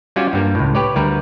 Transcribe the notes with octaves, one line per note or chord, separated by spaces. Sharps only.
G3 C#4 F4 F#4 D5
G2 G3 A#3
C#2 A2
G4 B4 C#5 D5
D2 G3 A#4 B4